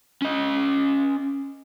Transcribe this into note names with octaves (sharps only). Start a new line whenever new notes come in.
C#4 D#5